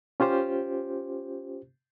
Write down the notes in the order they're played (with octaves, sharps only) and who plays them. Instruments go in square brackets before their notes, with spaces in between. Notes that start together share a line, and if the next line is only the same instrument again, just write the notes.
[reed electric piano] C#4 F4 G4 C5